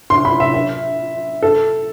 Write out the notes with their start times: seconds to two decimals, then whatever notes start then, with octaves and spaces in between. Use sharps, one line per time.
0.10 C6
0.25 B5
0.40 E5
0.54 E5
1.43 A4